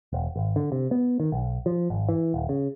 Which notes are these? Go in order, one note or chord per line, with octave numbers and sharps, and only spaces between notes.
E1
G#1
D3
C3
B3
D#3
B1
F3
G#1
E3
D#1
C#3